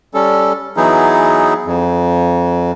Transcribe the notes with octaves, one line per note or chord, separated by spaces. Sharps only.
G3 C#4 A4
E3 F#3 B3 D#4 E4 G#4
F2